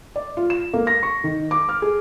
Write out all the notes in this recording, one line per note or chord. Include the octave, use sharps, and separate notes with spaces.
D5
F4
E7
A#3
A#6
C#6
D#3
D6
F6
G#4